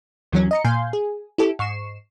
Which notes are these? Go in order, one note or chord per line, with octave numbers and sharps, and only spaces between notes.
D#2 E3 F#3 C#4
D#5 A#5 C#7
A#2 F5 G#5 C6 G6
G#4
E4 G4 A4
G#2 C#6 C7 E7